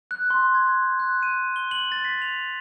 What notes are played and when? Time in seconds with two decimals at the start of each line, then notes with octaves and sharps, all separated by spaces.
0.11 F#6
0.30 C6
0.55 G#6
0.67 F#6
0.82 G6
0.99 F#6
1.23 D#7
1.56 G7
1.71 F#7
1.92 A6
2.05 B6
2.22 F7